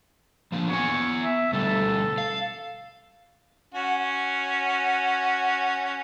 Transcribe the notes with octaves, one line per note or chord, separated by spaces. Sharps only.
F3 A#3 D4
B3 C#5 G#5
E5
B2 D3 G3 A4
F5
C#4 F#4